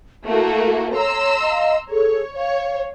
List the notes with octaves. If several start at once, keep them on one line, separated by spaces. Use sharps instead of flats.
A3 A#3 E4 F#4
C#5 A#5 C6 E6
D#5 F5
G#4 A4 C#5
C#5 F5